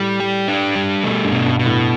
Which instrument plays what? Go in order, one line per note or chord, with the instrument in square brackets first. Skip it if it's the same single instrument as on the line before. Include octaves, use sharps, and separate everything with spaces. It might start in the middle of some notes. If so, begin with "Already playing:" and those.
Already playing: [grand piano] A2 [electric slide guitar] G3
[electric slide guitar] G4
D4
G3
[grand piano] B2 [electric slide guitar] A3
[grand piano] G2
[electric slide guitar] B2
[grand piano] G2
[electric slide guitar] B2
[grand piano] A2